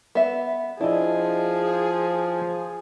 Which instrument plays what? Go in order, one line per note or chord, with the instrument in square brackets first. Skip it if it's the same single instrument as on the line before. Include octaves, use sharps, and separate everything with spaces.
[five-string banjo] B3 E5
[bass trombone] F3 [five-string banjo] D4 [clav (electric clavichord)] E4 D#5 [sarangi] G#4